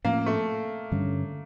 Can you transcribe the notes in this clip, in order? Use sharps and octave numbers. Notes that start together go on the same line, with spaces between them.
A2 F3 A#3 C#4
A3
G2 D3 G3 C#4